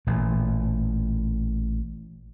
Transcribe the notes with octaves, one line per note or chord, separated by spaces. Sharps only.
A1 A#2